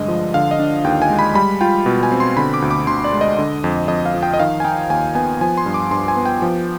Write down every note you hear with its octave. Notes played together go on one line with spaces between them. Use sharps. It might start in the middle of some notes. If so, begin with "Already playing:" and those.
Already playing: G2 D3 G#3 D#5
F3
D3 F5
D#5
D4
D#2 G5
G#5
G#3
B5
G3 B5
F4 G5
B2
G#5
C4
C6
D3 B5
D6
D2
D6
D2 C6
D5
G#3
D#5
D3
F2
F2 D#5
F5
F3
G5
D#5
D#3 F5
G#5
D#4 G5
D#2 G#5
B3 G#5
F3 G#5
C6
G2
D6
G2 C6
G#5
B3
G5
F3